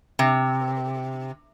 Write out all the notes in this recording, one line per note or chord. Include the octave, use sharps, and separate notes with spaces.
C3